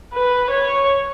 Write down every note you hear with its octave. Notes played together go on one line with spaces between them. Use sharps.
B4
C#5